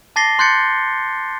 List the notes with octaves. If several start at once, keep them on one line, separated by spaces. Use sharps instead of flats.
A5 D6 A6 A#6 C7 G7
C6 F#6 G6 A6 C#7